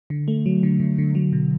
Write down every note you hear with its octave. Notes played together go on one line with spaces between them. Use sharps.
D3
A3
F#3
D3
D3
D3
F#3
B2